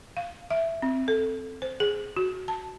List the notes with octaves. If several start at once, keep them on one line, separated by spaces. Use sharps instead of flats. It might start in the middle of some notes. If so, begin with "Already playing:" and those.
F5
E5
C4
A4
C5
G#4
F#4
A5